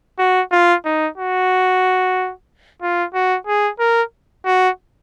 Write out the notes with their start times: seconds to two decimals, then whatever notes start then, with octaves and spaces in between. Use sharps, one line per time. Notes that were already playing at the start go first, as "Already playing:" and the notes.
0.19 F#4
0.52 F4
0.85 D#4
1.17 F#4
2.82 F4
3.14 F#4
3.47 G#4
3.79 A#4
4.46 F#4